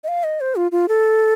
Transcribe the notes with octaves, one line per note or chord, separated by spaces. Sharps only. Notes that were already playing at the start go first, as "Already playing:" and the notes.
D#5
F5
D#5
C5
F4
F4
A4